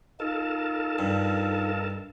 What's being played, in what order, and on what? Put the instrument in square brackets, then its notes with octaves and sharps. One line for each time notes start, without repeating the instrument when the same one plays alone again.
[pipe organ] D#4 F4 [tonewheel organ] A4 A#4 A5
[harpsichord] G2